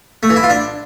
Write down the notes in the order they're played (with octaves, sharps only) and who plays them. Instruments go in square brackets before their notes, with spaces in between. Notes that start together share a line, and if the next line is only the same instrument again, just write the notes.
[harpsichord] A3
E3
E4
F4
D4